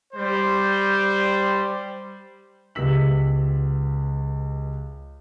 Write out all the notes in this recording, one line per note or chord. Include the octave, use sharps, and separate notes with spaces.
G3 C5
C#2 B3 G4 E6 B6 F#7